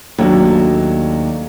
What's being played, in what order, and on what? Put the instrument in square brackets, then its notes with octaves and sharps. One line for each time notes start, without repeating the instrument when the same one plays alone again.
[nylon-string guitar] D#2 [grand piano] F#3 A3 D4